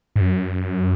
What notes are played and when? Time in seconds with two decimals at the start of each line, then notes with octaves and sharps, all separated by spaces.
0.16 G#2
0.21 F#2